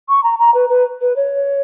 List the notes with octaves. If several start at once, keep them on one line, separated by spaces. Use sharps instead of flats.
C#6
A#5
A#5
B4
B4
B4
C#5